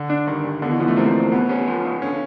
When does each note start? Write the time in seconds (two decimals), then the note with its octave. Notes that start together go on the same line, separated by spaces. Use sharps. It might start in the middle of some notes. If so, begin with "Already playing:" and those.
Already playing: D3
0.10 D4
0.27 G2 D#3
0.45 G2
0.62 B2 D3
0.71 E3
0.79 B2 F3
0.88 A3
0.97 A#3 C4
1.15 C2
1.32 B2 B3
1.49 C#4
1.67 F3
1.85 C#3
2.02 D3 C#4